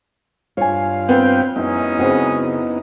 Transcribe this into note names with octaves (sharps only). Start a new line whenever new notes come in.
G2 F4 C#5 F5 G#5
B3 C4 B4 G5
F#2 G#3 B3 C#4 D#4 E4 D#6
C#3 C4 F#4